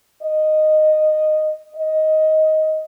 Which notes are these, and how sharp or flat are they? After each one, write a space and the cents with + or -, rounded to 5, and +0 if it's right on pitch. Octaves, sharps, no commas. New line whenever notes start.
D#5 -10
D#5 +10